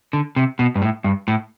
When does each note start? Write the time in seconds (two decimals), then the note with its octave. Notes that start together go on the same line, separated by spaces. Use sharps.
0.13 D3
0.36 C3
0.59 B2
0.75 G2
0.82 A2
1.04 G2
1.28 A2